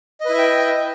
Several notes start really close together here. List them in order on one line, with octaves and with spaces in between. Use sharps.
D#5 B4 E4 E5 G5